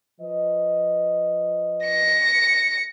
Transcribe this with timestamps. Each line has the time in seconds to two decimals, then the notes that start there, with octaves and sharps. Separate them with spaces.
0.20 F3 B4 D#5
1.86 A#6 C#7